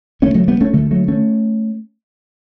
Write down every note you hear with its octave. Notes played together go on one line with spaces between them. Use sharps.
D2 C#3 A3 C#4
F#3 A3
G3 B3
A3 C#4
D2 D3 F#3 A3
F#3 A3
A3 C#4